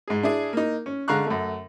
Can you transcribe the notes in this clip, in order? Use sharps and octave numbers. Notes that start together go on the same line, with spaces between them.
G#2 G#4
D4 E4 G#4
A#3 D#4
C#4
D3 G#3 F5 A#5 C#6 F#6
F#2 A3